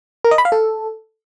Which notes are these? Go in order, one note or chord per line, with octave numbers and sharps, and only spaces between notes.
A#4
D#5
B5
F5
A4